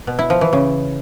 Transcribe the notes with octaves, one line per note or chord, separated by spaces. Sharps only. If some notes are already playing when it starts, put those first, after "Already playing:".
B2
E4
F3
E3
C#3